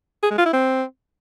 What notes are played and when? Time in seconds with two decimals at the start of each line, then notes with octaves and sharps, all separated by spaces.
0.23 G#4
0.30 G#3
0.38 F4
0.45 E4
0.53 C4